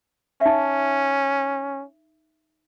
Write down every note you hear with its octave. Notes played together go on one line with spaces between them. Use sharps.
C#4 D#4 E5